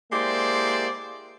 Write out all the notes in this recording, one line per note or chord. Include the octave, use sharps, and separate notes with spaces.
G#3 A#3 E4 G4 C5 D5